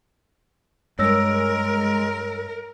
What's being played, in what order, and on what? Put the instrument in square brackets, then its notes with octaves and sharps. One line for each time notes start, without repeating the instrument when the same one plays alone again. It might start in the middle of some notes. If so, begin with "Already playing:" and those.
[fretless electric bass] G2 [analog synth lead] G#3 [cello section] A#4 [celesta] C#5 E6 A#6